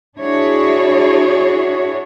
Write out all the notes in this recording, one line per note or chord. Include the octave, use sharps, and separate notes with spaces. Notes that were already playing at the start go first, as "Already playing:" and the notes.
D4 E4 F#4 G#4 C#5